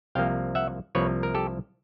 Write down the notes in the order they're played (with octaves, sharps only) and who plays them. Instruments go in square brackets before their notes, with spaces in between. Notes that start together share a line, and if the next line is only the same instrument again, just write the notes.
[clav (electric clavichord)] C2 C3 F3 A#3 F5 G5
E5 F#5
C2 C3 F3 A#3 B4 C#5
A#4
G4 A4